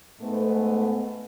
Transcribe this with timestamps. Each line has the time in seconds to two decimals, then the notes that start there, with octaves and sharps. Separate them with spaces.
0.20 G#2 A3 B3